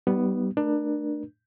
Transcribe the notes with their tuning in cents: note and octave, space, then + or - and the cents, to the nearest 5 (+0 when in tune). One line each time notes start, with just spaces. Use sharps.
G3 -25 B3 +0 D#4 +5
A3 +0 D4 +20 A#4 +35